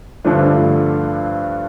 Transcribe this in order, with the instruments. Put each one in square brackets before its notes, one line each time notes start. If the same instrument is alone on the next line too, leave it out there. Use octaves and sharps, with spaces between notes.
[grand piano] G2 D3 F3 A3 D4